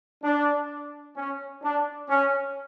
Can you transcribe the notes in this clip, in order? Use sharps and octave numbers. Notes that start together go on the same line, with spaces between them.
D4
C#4
D4
C#4